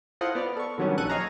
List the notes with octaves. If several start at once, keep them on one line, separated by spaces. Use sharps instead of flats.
E4 F4 A4 C5 D#5 F#5
B3 D5 F6
A4 C#6
D3 D#3 F#3 G3 B3 C#4
A#1 A4 F#5 C#6 F#6 D#7
G#4 C#5 D#5 F5 G#5 A#5